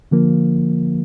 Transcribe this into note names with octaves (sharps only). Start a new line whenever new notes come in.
D3 F3 A#3